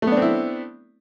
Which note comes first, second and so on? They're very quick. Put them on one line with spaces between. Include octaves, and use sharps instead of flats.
A3 B3 D4 C4 E4